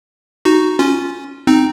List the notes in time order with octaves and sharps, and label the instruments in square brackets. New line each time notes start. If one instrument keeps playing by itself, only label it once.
[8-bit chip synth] D#4 F#4
C#4 F4
C4 D#4